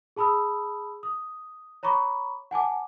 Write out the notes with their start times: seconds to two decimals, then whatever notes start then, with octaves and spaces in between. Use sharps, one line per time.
0.16 G#4 A5 B5 D#6 E6
1.03 D#6
1.83 C#5 A#5 B5 C#6 D6
2.51 F#5 G#5 A5 D6